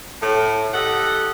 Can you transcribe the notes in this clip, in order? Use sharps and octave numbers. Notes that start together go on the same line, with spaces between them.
A2
G4 A4 D#5 F#5